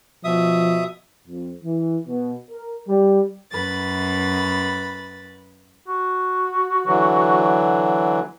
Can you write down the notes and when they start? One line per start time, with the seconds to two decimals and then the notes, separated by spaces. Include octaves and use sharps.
0.24 B2 F3 E5 D#6
1.27 F2
1.64 E3
2.06 B2
2.50 A#4
2.88 G3
3.53 F#2 B4 B5 A6
5.87 F#4
6.86 D3 E3 F#3